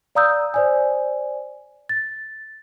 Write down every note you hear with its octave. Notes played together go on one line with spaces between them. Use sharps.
D5 F5 A#5 D#6 E6 G6
C5 D5 G#5
A6